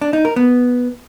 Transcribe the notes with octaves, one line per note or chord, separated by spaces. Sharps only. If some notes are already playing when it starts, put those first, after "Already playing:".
D4
D#4
A#4
B3